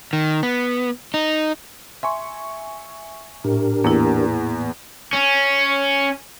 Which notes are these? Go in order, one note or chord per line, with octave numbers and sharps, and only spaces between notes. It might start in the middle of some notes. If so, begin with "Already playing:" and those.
D#3
B3
D#4
E5 G#5 C6 C#6
A2 D4 G4 A#4
E2 A#3 E4
C#4